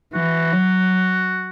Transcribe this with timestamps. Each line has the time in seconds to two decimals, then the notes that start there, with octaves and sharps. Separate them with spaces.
0.14 E3 F#4
0.52 F#3